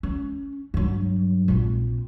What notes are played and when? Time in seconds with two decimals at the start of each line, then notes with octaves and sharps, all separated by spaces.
0.03 C#4
0.74 G2 F#3
1.48 A#1 C4